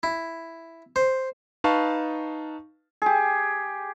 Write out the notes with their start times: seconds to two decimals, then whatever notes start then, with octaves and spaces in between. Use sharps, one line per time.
0.03 E4
0.96 C5
1.64 D#4 B4 F5 A5 C#6
3.02 G4 G#4